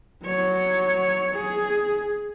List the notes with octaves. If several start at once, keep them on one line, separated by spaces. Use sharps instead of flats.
F#3 C#5
G#4